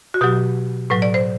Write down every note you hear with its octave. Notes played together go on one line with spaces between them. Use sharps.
F#4
B2 F#3 G4
A2 F#3 B4
D5
C5